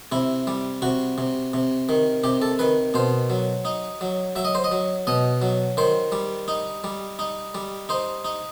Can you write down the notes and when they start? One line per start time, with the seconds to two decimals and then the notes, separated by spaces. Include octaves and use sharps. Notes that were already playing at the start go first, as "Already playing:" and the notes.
0.12 C3 E4
0.47 G3
0.82 C3 F#4
1.18 C3
1.54 C3
1.89 D#3
2.24 C3 G4
2.42 A4
2.59 D#3 B4
2.94 B2 C5
3.30 F#3
3.65 D#4
4.01 F#3
4.36 F#3 E5
4.45 D#5
4.55 C5
4.64 D#5
4.72 F#3
5.07 B2 D#5
5.42 F#3
5.77 D#3 C5
6.12 G3
6.48 D#4
6.84 G3
7.19 D#4
7.55 G3
7.89 D#4 C5
8.25 D#4